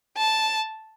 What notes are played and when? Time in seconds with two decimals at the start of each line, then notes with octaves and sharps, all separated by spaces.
0.18 A5